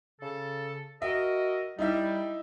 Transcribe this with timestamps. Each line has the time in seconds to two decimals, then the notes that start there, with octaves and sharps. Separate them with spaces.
0.21 C#3 A4
1.02 F#4 A#4 D#5 E5
1.79 G3 D#4 E4 E5